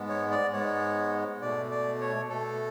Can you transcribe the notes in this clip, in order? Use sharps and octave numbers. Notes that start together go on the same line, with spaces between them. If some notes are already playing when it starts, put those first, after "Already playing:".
Already playing: G#2 G#3 B3
C#5
D5
G#2 G#3 B3 C#5
B2 A3 D5
D5
C#5
B2 A3 A4